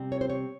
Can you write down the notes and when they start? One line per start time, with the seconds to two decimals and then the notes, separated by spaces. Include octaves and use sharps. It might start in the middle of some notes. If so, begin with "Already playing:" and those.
Already playing: C3 G3 C4
0.12 C#5
0.21 C5
0.30 C#5